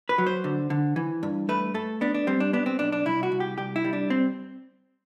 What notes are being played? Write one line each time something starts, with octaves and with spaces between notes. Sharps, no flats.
B4
F#3
C5
D3
D3
E3
G2
A3 B4
A3 A4
B3 D4
D4
G3 C4
D4
B3 D4
C4
B1 D4
D4
C2 E4
F#4
C2
G4
C2 G4
E4
G3
D4
C4